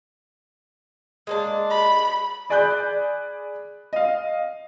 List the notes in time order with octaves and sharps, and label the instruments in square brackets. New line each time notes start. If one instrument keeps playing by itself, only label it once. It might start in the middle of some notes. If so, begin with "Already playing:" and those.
[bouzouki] G#3 A#3 D4
[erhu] B5
[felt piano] G#4 D5 G#5 B5 F#6 G6
D#5 F5